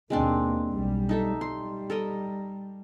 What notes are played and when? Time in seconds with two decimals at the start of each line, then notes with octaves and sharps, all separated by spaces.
0.10 D#2 B2 G#3 A#3 C4 D4
0.72 B1 G3
1.09 D#4 A4 E5
1.41 G3 C6
1.90 A4 A#4 D#5